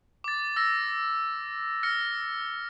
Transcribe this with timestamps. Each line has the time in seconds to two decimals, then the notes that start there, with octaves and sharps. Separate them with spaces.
0.24 D6 A6
0.56 E6 A#6
1.83 F6 A#6 C#7